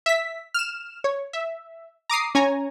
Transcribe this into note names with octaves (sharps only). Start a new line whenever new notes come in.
E5 B6
F6 E7
C#5
E5
A#5 D6 D#6 C7
C#4 C#5 G#5 A#5